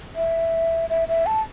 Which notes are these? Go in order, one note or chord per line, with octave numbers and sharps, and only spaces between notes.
E5
E5
E5
A5